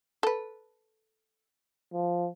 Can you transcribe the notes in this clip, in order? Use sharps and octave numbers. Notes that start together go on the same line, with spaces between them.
A4 B4
F3